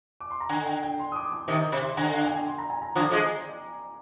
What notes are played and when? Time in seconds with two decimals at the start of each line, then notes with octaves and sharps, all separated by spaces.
0.20 D6
0.31 C6
0.40 A#5
0.49 D3 G#5
0.66 G5
0.82 G5
0.99 C6
1.12 D#6
1.16 D6
1.32 D6
1.48 C3 D#3 D#6
1.64 D6
1.72 C3
1.81 C6
1.97 D3 G#5
2.14 F5
2.23 G#5
2.30 G5
2.47 C6
2.58 A#5
2.70 G#5
2.82 A#5
2.95 D3 F3 D6
3.11 F3 G#3